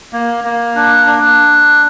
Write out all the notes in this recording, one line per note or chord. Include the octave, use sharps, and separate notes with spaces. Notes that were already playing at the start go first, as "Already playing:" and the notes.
A#3
A#3
D4
D4